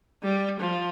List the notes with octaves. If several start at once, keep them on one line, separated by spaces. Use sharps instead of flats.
G3
F3